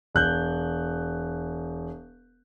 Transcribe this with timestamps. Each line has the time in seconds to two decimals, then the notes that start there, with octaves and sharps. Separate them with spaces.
0.15 E1 F#6 G6